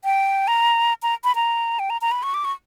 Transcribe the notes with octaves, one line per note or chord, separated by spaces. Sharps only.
G5
A#5
A#5
B5
A#5
G5
A#5
A#5
B5
C#6
D6
C#6